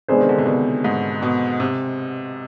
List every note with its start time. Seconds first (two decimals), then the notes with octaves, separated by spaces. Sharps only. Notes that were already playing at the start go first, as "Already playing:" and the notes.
0.08 C3 G#3 B3 D4 G#4 C5
0.21 D#3
0.29 D3
0.38 C3
0.46 B2
0.84 G#2
1.22 B2
1.60 C3